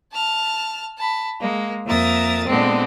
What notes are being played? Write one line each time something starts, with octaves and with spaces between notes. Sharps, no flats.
A5 F6
A5 B5
G#3 A#3
F2 A#3 A#4 E5 D#6 A6
A#2 D3 G#3 B3 C4